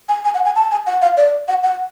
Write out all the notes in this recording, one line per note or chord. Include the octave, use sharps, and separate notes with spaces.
G#5
G#5
F#5
G#5
A5
G#5
F#5
F5
D5
F#5
F#5